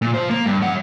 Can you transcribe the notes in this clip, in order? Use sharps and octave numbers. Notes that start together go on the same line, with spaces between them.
A#2
F4 C5
A#3
G2
F#2 F#5